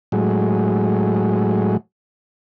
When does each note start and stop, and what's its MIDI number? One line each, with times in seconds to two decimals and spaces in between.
0.12 1.77 45
0.12 1.77 54
0.12 1.77 56